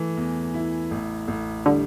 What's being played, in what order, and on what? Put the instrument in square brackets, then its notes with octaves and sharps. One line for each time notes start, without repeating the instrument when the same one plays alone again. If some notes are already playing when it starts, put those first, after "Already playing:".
Already playing: [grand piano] E3 A3
E2
E4
A1
A1
[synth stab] D3 [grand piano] G3